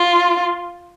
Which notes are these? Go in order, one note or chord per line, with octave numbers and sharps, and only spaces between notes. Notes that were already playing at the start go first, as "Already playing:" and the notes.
Already playing: F4